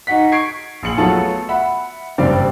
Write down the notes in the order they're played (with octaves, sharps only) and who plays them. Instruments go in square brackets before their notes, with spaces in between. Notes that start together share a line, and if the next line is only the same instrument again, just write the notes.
[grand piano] D#4 F#4 F#5 B6
C#6 G#6 C7 D7
A#1 G#4 C#7 F#7
F#3 A3 B3 F4 F#4 A4
E5 F#5 B5
F#1 G2 G3 C4 D5